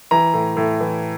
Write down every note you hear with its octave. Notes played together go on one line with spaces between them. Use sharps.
E3 A#5
A2
A2
E3